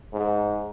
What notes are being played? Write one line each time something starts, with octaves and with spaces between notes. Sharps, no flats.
G#2